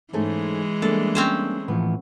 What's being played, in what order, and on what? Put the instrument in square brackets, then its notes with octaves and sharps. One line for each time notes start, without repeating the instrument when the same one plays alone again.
[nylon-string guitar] G#2 A3 C#4 [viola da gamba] E3 G#3
[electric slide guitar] G3 A#3 D4 [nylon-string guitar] A3 [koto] A4
[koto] C4 C#4 C5
[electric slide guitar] A2 E3 F3 [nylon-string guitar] B3